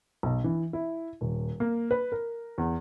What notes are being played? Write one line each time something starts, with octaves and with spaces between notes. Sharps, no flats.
B1
E3
E4
D#1
A#3
B4
A#4
E2